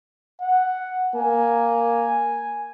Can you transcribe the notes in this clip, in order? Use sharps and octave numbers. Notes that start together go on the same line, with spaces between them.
F#5
A#3 G#5